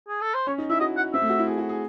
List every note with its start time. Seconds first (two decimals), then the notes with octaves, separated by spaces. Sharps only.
0.08 G#4
0.21 A4
0.34 C5
0.47 C#4 C#5
0.58 D#4
0.70 E4 E5
0.80 F#4 D#5
0.97 F#5
1.14 C4 E5
1.22 A3
1.30 F#4
1.39 E4
1.47 G#4
1.58 F#4
1.69 G#4